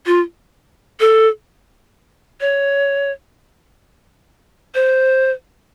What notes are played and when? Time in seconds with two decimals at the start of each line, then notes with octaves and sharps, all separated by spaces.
0.06 F4
1.00 A4
2.41 C#5
4.75 C5